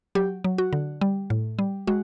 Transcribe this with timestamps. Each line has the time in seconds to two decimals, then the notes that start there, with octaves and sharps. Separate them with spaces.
0.15 F#3 G4
0.44 F#3
0.58 F#4
0.73 D3
1.01 G3
1.30 A2
1.59 G3
1.87 G#3 F#4